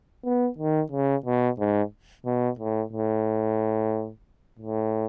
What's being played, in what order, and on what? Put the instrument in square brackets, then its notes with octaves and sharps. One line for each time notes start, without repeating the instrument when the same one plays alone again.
[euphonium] B3
D#3
C#3
B2
G#2
B2
A2
A2
A2